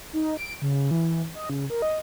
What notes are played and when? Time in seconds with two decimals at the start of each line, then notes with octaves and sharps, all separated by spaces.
0.13 D#4
0.37 D7
0.62 C#3
0.91 E3
1.35 D#5
1.50 C#3
1.70 A#4
1.82 D#5